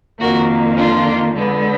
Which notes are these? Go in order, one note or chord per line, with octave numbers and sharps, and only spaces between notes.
F2 D#3 A#3 F#4 A#4
D4 F4
D3 G#3 B3